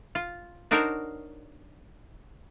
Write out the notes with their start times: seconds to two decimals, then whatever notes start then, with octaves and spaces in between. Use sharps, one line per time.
0.15 F4
0.71 D4 D#4 F#4 A#4 C5 C#5